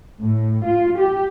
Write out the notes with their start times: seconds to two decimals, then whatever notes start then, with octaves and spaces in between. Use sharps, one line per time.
0.21 A2
0.66 F4
0.98 G4